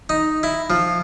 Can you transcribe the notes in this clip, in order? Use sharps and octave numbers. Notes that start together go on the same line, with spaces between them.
D#4
E4
F3